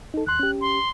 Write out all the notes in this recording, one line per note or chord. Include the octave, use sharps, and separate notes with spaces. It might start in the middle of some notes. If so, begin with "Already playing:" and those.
D#4 A4
D#2 C6 F#6
C#4 G4
C6